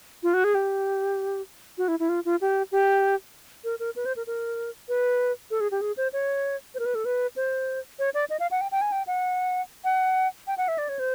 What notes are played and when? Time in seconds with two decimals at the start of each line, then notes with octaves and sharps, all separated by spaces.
0.23 F4
0.34 F#4
0.44 G#4
0.55 G4
1.78 F#4
1.88 E4
2.00 E4
2.09 F4
2.25 F4
2.41 G4
2.72 G4
3.64 A#4
3.80 A#4
3.96 B4
4.06 C5
4.16 A#4
4.27 A#4
4.89 B4
5.51 A4
5.60 G#4
5.71 G4
5.81 G#4
5.97 C5
6.13 C#5
6.75 C5
6.79 A#4
6.86 B4
6.95 A4
7.05 B4
7.36 C5
7.99 C#5
8.14 D5
8.30 D#5
8.40 F5
8.51 F#5
8.61 G5
8.72 G5
8.81 G#5
8.92 G5
9.07 F#5
9.84 F#5
10.47 G5
10.58 F#5
10.68 E5
10.78 D5
10.89 C#5
10.99 C5